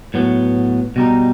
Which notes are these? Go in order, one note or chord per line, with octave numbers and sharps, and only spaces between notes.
A2 F#3 B3
B2 G3 D#4